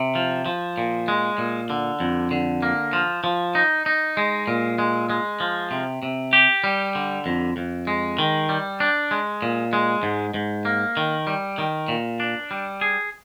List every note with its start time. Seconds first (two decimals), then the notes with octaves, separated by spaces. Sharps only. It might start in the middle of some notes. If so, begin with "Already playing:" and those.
Already playing: C3
0.15 F3
0.46 F3
0.78 A#2
1.08 G#3
1.38 A#2
1.70 D3
2.00 F2
2.31 D3
2.62 A#3
2.93 F3
3.24 F3
3.55 D#4
3.86 D#4
4.17 G#3
4.48 A#2
4.78 G#3
5.10 G#3
5.40 F3
5.71 C3
6.03 C3
6.33 G4
6.64 G3
6.95 D3
7.26 F2
7.57 F2
7.87 G#3
8.19 D#3
8.49 G3
8.80 D4
9.11 G#3
9.42 A#2
9.73 G#3
10.03 G#2
10.34 G#2
10.65 A#3
10.97 D#3
11.27 G3
11.58 D#3
11.88 A#2
12.20 D4
12.51 G3
12.81 G#4